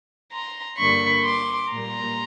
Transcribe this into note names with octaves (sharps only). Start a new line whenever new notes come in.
A#5 C6
G2 D3 G3 A#3 B5 C#6
C6 D6
A#2 G3 A#3 A#5 C6